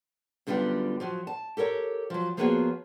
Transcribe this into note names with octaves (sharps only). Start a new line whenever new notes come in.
F#2 D3 G3 B3 F4 G4
F3 F#3 F#4
A5
G4 A4 A#4 C#5
F3 F#3
F3 A#3 B3 F#4 G#4 C#5